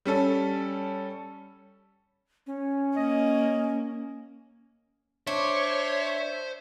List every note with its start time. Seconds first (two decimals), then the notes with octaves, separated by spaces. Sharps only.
0.06 G3 C#4 A4
2.47 C#4
2.97 A#3 D#5
5.27 D4 C5 C#5 E5